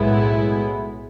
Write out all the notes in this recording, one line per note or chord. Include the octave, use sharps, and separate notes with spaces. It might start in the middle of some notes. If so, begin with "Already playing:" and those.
Already playing: B1 A2 G#3 B3 E4